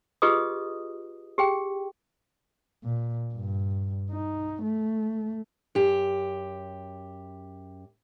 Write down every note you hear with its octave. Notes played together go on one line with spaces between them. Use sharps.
F4 G4 G#4 B4 D#5 D#6
G4 G#4 G5
A#2
G2
D#4
A3
F#2 G4